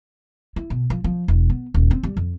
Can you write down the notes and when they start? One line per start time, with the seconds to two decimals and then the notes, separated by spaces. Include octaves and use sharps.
0.56 E4
0.70 B2
0.90 F3
1.04 F3
1.28 E1
1.50 B3
1.74 D#1
1.91 C4
2.03 G3
2.17 F2